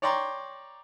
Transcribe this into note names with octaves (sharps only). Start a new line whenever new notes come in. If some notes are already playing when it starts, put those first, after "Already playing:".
C#5 D5 G5 A#5 C6